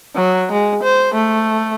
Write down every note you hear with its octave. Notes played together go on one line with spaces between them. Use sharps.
F#3
G#3
C5
A3